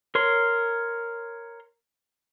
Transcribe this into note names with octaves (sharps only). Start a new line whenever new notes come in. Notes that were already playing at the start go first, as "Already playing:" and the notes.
A#4 C#5 C6